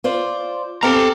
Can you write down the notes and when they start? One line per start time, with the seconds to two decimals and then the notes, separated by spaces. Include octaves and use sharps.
0.04 F4 C5 D5
0.83 C4 G4 A4 F5 A#5